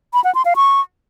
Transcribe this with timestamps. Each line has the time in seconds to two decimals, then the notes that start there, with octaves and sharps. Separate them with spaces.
0.14 B5
0.24 F#5
0.35 C6
0.45 F5
0.56 C#6